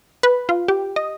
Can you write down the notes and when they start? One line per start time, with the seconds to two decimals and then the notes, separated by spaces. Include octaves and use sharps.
0.23 B4
0.49 F4
0.68 G4
0.96 D#5